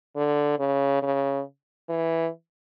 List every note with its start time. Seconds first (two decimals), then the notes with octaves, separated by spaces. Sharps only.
0.16 D3
0.59 C#3
1.02 C#3
1.89 E3